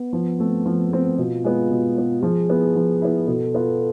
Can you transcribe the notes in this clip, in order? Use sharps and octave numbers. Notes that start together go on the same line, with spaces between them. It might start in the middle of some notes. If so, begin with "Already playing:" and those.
Already playing: B3
F3
A3 C4
F3
A3 C4
B2 F4
G#3 B3
B2
G#3 B3
F3 G#4
B3 E4
F3
B3 E4
B2 A4
B3 F4